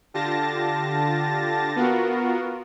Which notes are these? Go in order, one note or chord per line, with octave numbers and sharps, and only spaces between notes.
D3 F4 G4 A5 A6 A#6
B3 F4 F#4 A#4